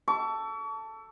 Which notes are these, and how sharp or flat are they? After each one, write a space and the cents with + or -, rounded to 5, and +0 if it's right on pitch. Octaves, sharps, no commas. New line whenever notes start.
A4 +5 C#6 +40